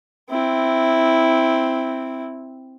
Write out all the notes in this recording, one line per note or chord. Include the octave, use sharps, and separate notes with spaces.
C4 E4